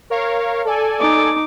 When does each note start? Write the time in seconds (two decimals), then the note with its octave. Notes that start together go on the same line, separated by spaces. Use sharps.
0.10 A#4 C#5 F5
0.65 A4 D5 G#5
1.00 D#4 D6